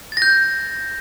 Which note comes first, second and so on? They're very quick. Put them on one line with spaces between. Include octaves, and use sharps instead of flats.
A6 A#6 G6